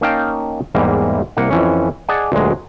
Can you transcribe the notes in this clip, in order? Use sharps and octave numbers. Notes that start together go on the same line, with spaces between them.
A#3 C#4 D#4 F5 G5 A5
E2 G#2 E3 G3 A#3
C2 A#3 F#5
F2 E3 C#4
G#4 D5 D#5 F#5 G#5 A5
D2 A#2 F#3 G#3